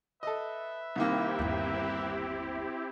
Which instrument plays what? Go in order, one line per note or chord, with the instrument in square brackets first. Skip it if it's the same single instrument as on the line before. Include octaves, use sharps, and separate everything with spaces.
[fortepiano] A4 D#5 [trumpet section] B4 E5
[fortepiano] C2 D#3 A#3 [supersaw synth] C4 E4 G4
[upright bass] G1 D#2